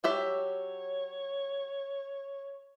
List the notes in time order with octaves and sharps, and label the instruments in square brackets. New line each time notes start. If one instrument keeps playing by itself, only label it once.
[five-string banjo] F#3 G4 E5 [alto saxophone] C#5